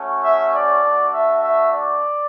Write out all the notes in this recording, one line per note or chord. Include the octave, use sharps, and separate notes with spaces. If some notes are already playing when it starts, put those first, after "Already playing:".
Already playing: A3 C#4 F#4
E5
D5
A3 D4 F#4
E5
E5
D5